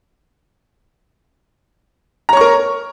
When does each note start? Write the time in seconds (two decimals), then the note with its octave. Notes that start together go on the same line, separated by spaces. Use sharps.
2.29 A#5
2.33 C#5
2.37 C#6
2.41 A#4